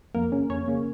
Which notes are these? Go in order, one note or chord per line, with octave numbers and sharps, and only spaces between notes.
F2 A#3 A#4
C#3 A#3 C#4
F2 C#4 C#5
C#3 A#3 C#4